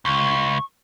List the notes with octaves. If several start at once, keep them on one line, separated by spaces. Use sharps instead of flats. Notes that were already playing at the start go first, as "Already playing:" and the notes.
C#2 C#6